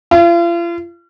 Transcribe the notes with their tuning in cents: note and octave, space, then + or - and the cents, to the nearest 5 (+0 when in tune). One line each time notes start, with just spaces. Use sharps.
F4 -40